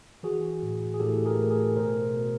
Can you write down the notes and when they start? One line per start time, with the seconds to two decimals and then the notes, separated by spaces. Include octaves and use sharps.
0.23 E3 F#4 G#4
0.63 A2
0.94 G#4
1.00 A2 G4 A4
1.25 G#4 A#4
1.39 A3
1.51 G#4 A#4
1.76 B2 A#4 C5
2.15 B2